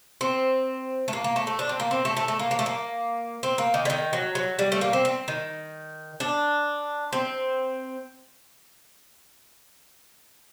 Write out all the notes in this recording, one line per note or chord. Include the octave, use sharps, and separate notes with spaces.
C4
A3
A#3
A#3
A3
A3
D4
C4
A#3
C4
A3
A3
A3
A#3
A#3
A3
A#3
C4
A#3
D#3
D3
D#3
F#3
F#3
G3
A3
A#3
C4
C4
D#3
D4
C4